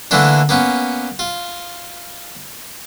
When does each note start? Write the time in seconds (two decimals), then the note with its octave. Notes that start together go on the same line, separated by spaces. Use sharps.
0.11 D3 E3 A3 A#3 D4
0.49 A#3 B3 C#4
1.19 F4